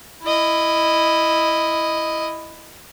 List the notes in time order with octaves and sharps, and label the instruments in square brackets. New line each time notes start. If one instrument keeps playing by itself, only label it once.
[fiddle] E4 D#5